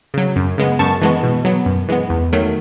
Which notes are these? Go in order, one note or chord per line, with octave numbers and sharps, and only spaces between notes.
C#3 F#3
F#2
C#3 G#3 B3
F#2 A5 C#6
E3 G#3 B3
B2
F#3 B3
F#2
E3 G#3 B3
E2
D#3 F#3 A3